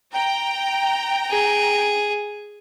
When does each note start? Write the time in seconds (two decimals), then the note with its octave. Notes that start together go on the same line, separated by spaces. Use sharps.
0.13 G5 A#5
1.31 G#4